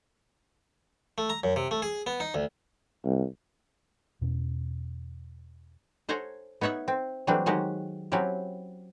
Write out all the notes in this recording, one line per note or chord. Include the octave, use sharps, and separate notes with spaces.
A3
A#5
F#2
C3
A3
G#4
B3
D#4
D2
C2
E2 B2 C#4
A4 C5 C#5 F#5 G#5 A#5
B3 D#4 C#5 E5 F#5
C4
E3 F#3 G3 A3 C4 D4
D#3 F#3 G#3 F#4 G4
F#3 C4 C#4 E4 G4